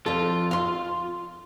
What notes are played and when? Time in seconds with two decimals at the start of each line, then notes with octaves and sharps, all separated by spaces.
0.06 F2 F4 A4
0.51 F5 C6